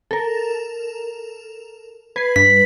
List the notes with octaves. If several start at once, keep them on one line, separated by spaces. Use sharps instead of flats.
A4 A#4
B4 G#6 C7
G2 B6